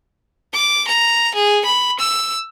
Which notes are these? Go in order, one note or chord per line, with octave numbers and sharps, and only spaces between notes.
D6
A#5
G#4
B5
E6